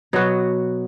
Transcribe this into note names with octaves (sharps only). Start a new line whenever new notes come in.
B2 F#3 B3 F#4